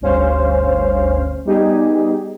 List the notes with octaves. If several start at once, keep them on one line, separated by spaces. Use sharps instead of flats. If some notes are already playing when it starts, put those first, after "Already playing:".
G1 D2 G2 C#4 C5 F5
G3 B3 D#4 G4 G#4